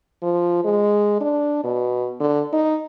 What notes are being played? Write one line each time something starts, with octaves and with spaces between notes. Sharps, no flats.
F3
G#3
D4
B2
D3
D#4